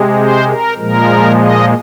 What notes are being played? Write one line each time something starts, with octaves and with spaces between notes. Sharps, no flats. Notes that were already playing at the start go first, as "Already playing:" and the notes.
Already playing: C3 G#3
C5
A#4
A#2 F3 G#3 A#4
D#5